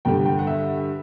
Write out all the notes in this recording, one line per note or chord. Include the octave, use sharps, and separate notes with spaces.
G2 D3 G5
G5
F#5
E5